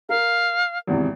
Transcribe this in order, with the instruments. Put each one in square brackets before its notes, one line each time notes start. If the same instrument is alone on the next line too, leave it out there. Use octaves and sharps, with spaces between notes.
[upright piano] A#4 [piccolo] F5
[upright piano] G#1 E2 C3